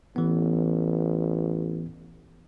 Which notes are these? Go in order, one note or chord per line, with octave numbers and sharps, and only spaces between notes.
A1 E3 B3